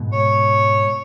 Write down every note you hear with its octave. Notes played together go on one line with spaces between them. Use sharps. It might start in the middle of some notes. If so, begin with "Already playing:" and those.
Already playing: G#2 B2
C#5